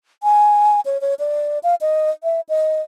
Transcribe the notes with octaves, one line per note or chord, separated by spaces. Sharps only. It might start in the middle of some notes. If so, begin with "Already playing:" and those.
G#5
C#5
C#5
D5
F5
D#5
E5
D#5